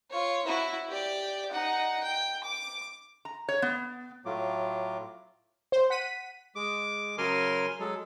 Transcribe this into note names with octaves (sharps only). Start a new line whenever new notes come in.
F4 C#5
E4 F#4
G4 D5
D#4 F#5
G5
D6
A#5
C#5
B3
A2 F#3 A3 F4 D6
C5
F#5 B6 D#7
G#3 D6
C#3 F#3 A#4 G#5 C6 F6
F#3 G#3 A4